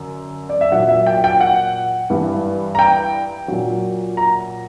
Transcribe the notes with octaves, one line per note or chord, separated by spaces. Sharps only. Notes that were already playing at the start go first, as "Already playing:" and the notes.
Already playing: F#2 D3
D5
E5
A#2 F#3 F#5
E5
G5
G5
F#5
G2 E3 G3
A#5
G5
A#2 F#3
A#5